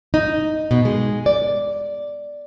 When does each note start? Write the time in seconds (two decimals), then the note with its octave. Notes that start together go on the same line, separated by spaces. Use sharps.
0.14 D#4
0.71 B2
0.85 G#3
1.26 D5